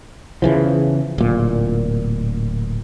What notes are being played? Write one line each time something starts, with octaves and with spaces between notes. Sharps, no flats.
E2 C#3 E3 F3
D1 A#2